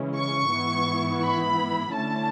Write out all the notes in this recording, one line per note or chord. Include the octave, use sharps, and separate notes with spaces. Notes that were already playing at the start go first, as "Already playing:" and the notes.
Already playing: C#3 E3 G#3 C#4 E4
C#6
G#2 E3 B3 E4
B5
D3 A3 C#4 E4 A5